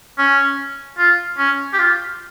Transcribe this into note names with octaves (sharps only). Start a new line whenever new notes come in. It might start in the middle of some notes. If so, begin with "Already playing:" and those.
C#4
F4
C#4
G4
F4